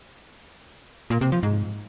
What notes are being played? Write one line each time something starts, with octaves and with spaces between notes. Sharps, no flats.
A#2
C3
F3
G#2